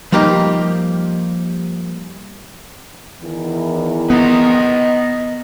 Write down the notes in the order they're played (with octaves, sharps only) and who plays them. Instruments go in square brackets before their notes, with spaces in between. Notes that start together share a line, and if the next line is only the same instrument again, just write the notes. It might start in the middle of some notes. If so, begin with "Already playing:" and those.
[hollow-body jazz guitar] F3 G3 A#3 D#4 G4
[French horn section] E2 D#3 E3
[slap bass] B3 [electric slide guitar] B4 D#5 A#5